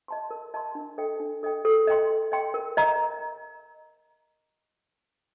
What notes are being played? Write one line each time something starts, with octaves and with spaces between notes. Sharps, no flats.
D#5 A5 C6
A#4
D#5 A5 C6
D4
A4 D#5 G5
D4
A4 D#5 G5
A4
D#5 G5 C6
A4
D#5 G5 C6
A#4
D#5 A#5